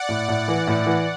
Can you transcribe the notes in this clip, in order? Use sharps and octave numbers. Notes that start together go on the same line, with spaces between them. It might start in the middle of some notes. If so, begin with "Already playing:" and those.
Already playing: D5 F#5
A2
A2
E3
A2
E3